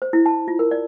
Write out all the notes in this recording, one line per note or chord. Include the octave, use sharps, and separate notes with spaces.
C5
E4
A5
F4
A#4
D5